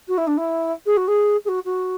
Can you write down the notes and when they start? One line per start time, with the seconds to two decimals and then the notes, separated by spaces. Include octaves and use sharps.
0.08 F#4
0.18 E4
0.27 D4
0.37 E4
0.86 G#4
0.97 F#4
1.08 G#4
1.45 G#4
1.48 F#4
1.65 F#4